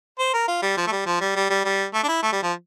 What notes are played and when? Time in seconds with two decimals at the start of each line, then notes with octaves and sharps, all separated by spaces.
0.19 C5
0.34 A#4
0.48 F4
0.62 G3
0.77 F3
0.87 A3
0.92 G3
1.06 F3
1.21 G3
1.36 G3
1.50 G3
1.65 G3
1.94 A3
2.04 D4
2.08 E4
2.23 A3
2.32 G3
2.43 F3